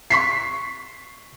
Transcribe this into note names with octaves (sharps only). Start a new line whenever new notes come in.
C#6 B6 C7